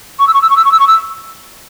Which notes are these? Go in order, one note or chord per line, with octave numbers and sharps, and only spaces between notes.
C#6
E6
C#6
E6
C#6
E6
C#6
E6
C#6
E6